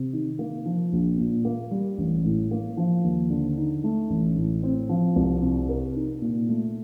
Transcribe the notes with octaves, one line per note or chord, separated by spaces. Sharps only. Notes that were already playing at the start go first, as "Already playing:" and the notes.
Already playing: C3
D#3
A#3
F3
A#1
A#2
A#3
G3
A1
A2
A#3
F3
D#2
D3
D#4
A3
A1
A2
C4
F3
C2
C3
A#4
D#4
A#2
A3